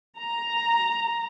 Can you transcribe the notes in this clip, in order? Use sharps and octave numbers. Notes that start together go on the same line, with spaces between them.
A#5